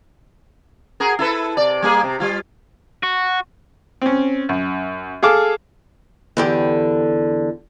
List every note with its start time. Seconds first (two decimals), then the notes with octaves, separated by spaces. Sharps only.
1.00 F#4 G#4 A#4
1.19 E4 A4 B4
1.57 C3 D5
1.82 G3 A#3 G#4
2.03 C3
2.20 G3 F4
3.03 F#4
4.02 C4 C#4
4.49 F#2
5.23 G#4 A4 F5 D6
6.37 E2 D3 G4